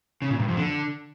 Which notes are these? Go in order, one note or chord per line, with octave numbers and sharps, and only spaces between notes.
C#3
A#2
G2
F2
D3